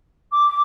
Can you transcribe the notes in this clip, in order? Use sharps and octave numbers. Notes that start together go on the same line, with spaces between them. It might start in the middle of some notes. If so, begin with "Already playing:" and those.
D6